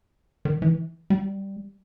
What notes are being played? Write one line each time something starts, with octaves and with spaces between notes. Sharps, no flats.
D#3
E3
G3